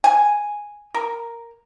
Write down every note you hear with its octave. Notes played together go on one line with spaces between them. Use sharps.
G#5
A#4